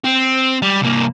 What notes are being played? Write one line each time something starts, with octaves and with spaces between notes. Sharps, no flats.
C4
G3
C2 A#3